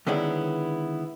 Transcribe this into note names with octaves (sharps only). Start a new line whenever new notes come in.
D3 D#3 G#3 B3 C#4 E4